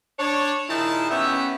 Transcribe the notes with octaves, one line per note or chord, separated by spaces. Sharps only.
D4 C#5
A#2 D#3 D#4 E4 G#4 A5
B3 C#4 G4 E5